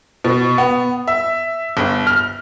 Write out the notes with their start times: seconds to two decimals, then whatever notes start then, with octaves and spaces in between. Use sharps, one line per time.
0.24 B2
0.58 B3
1.08 E5
1.77 G1
2.07 F6